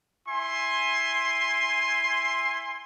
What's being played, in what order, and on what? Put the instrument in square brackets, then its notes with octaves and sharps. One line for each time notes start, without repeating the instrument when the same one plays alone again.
[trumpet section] E4 G#5 C6